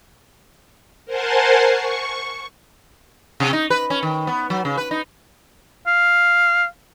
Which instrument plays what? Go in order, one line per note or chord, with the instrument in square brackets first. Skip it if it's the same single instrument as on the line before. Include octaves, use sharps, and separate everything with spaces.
[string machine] A#4 C5 F#5 G#5 A5 C6
C#6
[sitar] C3
D#4
B4
C#4
D#3
B3
F#3
C#3
B4
D#4
[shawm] F5